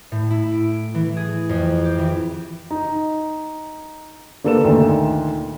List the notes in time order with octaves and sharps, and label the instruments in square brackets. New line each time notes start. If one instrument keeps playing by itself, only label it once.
[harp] A2
E4
D7
E3
G#4
F2
G4
E3
[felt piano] D#4
D3 A#3 A4 B4 E7
D2 A#2 D#3